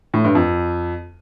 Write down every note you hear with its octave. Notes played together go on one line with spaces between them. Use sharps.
A2
G2
F2